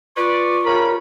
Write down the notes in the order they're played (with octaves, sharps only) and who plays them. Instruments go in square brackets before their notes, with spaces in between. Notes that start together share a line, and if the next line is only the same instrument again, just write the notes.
[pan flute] F4 [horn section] B4 D5 [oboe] C#6
[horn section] G2 C#3 B5 [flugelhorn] A#4